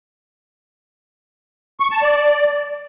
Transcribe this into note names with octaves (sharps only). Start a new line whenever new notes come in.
C#6
A5
D5